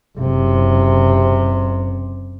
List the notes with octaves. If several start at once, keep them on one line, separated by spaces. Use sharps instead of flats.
F#1 C3